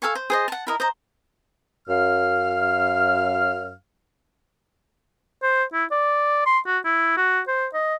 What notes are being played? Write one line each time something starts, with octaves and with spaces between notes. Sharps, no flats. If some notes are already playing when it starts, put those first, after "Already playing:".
A4 F5 G#5 C#6
C5
G#4 C5 D#5
F#5 A5
E4 A#4 D#5
C5 D#5 A#5
F#2 F5 F6
C5
E4
D5
C6
F#4
E4
F#4
C5
D#5